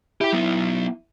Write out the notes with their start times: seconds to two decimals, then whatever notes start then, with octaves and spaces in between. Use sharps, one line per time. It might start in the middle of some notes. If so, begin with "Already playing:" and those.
0.21 E4 G4 G5
0.32 F#3 B3